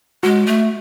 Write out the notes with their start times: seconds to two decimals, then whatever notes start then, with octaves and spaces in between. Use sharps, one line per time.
0.23 G#3 F#4
0.47 A3